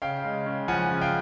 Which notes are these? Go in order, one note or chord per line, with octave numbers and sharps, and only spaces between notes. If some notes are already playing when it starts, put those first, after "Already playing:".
C#3 F5 G5
G#3
C#3
F3 F#5 G#5
C#3
F5 G5